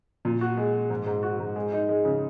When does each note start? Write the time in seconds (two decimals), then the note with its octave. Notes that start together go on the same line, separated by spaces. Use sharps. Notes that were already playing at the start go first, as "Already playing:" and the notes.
0.25 A#2
0.41 F#4
0.57 G#3
0.74 G#3
0.90 G#2
1.06 G#2
1.23 F#4
1.40 G#2
1.56 G#3
1.73 D#4
1.89 G#3
2.05 C#3